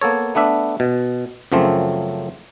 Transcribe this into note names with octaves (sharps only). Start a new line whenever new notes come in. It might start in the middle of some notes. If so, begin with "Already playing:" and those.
A#3 B3 A4 C#5
A3 B3 D4 E5
B2
F#2 C#3 F3 F#3 A3 C4